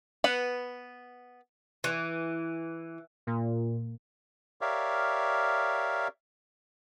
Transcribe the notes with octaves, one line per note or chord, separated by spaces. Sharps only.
B3 B4 F#5
E3
A#2
G4 A#4 C#5 D5 E5 F5